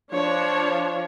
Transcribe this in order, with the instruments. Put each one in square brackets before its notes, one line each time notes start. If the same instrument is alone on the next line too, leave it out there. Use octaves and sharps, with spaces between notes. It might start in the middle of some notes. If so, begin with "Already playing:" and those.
[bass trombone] F3 [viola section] D4 C#5